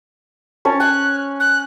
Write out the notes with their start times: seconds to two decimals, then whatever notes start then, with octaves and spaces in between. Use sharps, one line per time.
0.65 C#4 C#5 A5
0.80 G#5 F#6
1.40 F#6